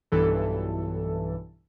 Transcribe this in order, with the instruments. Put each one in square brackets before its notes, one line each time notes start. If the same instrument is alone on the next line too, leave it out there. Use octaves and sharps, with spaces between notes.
[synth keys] B1 G2 E3 A4